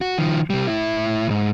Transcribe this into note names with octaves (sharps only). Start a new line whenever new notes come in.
F#4
D#3 F3
C2 G3
A2 E4
D2 G#2